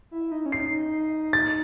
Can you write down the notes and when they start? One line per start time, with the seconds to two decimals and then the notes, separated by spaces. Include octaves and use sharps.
0.11 E4
0.32 D#4
0.46 C#4
0.52 C7
0.60 D#4
1.33 A6